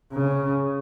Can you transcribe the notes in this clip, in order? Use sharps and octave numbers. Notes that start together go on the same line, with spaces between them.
C#3